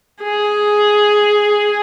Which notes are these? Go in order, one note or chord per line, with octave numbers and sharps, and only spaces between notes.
G#4